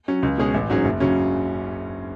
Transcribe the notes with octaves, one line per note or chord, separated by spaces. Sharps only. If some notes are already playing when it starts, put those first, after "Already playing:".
F#3 C#4
C#2
B2 G#3 C#4 G#4
A1
G#2 F#3 C#4 G#4
F#1
C#3 F#3 C#4